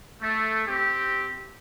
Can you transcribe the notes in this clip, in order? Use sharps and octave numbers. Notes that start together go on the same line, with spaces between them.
A3
C4 G4